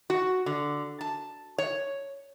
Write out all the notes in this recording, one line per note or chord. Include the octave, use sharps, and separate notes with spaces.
F#4
D3
A5
C#5